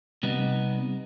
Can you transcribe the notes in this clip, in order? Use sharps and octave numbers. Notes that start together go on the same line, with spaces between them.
C3 G3 B3 D#4